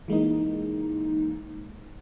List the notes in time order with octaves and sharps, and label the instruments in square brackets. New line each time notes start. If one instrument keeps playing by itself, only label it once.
[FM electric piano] E3 G#3 A#3 D#4